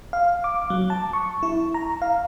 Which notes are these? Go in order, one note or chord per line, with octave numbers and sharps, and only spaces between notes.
F5
D6
F#3
A5
C#6
E4
A#5
F5